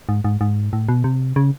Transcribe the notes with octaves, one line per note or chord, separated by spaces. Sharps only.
G#2
G#2
G#2
A2
B2
C3
C#3